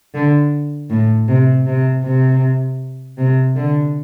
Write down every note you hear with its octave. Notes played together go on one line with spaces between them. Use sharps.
D3
A2
C3
C3
C3
C3
D3